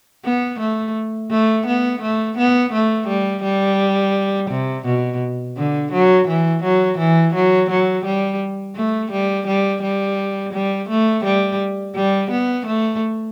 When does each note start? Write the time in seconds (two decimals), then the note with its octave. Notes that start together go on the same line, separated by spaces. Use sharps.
0.25 B3
0.60 A3
1.31 A3
1.67 B3
2.02 A3
2.37 B3
2.73 A3
3.08 G3
3.43 G3
4.50 C3
4.85 B2
5.57 D3
5.92 F#3
6.28 E3
6.63 F#3
6.98 E3
7.34 F#3
7.70 F#3
8.05 G3
8.76 A3
9.11 G3
9.47 G3
9.82 G3
10.53 G3
10.89 A3
11.25 G3
11.95 G3
12.31 B3
12.66 A3